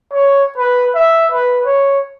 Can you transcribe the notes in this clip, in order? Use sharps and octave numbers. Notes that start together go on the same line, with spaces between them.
C#5
B4
E5
B4
C#5